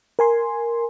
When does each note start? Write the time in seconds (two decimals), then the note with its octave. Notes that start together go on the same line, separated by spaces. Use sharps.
0.19 A#4 G#5 C6